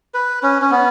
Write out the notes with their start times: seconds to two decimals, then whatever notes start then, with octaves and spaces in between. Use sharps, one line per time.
0.14 B4
0.43 C#4
0.62 C#4
0.71 B3